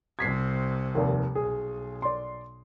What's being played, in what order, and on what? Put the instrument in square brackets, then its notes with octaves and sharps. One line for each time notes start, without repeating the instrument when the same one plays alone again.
[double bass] C2 C3 [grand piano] G#6 B6 C7
[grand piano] F1 D#2
[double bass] B1 [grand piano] G#4
[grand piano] D5 C6